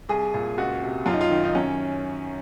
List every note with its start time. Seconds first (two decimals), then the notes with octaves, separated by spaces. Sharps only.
0.09 C2 G#4
0.34 A#2
0.58 C#2 F#4
0.82 C3
1.06 F#2 F4
1.13 D#4
1.21 F4
1.30 D#3
1.44 D#4
1.55 F#2 C#4